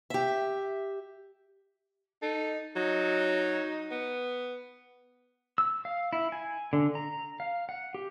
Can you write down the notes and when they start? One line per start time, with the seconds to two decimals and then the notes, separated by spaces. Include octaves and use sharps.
0.10 G4 E5
2.22 D#4 A4
2.76 F#3 D#4
3.91 B3
5.58 E6
5.85 F5
6.13 E4
6.32 G#5
6.73 D3
6.95 A#5
7.40 F5
7.69 F#5
7.94 G4